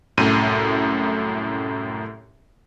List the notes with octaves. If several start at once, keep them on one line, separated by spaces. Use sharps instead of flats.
C2 F#2 A2 D#7